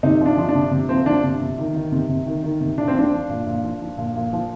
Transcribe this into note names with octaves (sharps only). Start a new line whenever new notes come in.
C3 D#4
F3
D4
F3
D4
C3
C3
F3 C4
F3 D4
C3
C3
D#3
D#3
C3
C3
D#3
D#3
C3
A#2 D4
C4
F3 D4
F3
A#2
A#2
F3
F3
A#2
A#2
F3